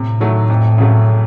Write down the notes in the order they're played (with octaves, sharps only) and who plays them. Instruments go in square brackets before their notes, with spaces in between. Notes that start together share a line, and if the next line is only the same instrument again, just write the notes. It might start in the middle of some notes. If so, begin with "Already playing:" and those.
Already playing: [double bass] A2 [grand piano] C3
[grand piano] D#3 F#3 A3
F2
C#3 F#3 A3